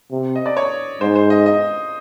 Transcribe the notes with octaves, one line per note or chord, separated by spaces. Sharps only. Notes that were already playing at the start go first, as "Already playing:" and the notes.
C3
D#5
D5
C#5
G#2 C5
C5
D#5
D#5